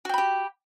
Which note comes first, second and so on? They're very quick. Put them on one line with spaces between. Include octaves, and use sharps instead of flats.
F#4 G5 B5 G4